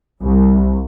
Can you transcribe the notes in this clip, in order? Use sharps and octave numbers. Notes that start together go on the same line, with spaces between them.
C2